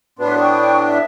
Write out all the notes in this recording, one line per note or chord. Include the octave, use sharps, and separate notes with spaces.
A2 B3 D4 F#4 B4 C6
G5 C#6 D#6
E5